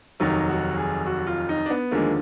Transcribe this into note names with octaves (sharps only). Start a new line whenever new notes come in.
F1 D#2 D#3 F#3 D#4
F#4
G#4
F#4
F4
D#4
D4
B3
D#2 D3 F3 G#3 A#3